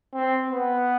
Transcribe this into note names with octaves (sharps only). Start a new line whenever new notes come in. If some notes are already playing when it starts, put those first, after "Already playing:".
C4
B3